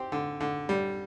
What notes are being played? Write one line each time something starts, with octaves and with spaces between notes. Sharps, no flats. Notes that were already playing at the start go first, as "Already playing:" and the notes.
Already playing: C4 G4
D3
D3
G3